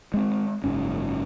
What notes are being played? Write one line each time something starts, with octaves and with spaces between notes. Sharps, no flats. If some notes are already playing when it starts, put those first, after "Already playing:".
G#3 C4
F#1 G#2 C#4